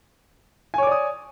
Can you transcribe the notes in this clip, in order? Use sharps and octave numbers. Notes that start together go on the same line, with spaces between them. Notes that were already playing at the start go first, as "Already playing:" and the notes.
C#5 D5 G#5 D6 D#6